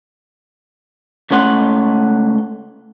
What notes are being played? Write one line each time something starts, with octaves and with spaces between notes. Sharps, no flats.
C#2 A3 C#4 F#5 C6